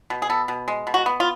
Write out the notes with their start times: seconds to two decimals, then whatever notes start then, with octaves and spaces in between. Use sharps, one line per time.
0.10 B2
0.22 G#4
0.30 B3 A4
0.48 B2
0.68 G#3
0.87 B2
0.94 F#4
1.06 B3
1.20 F4